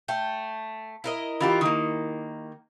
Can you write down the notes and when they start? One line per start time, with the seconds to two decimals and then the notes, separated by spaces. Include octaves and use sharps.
0.08 A3 G5
1.04 E4 A#4 D#5
1.40 E3 F4 G4
1.61 D#3 A#3